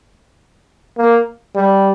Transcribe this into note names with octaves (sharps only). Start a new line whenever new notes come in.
A#3
G3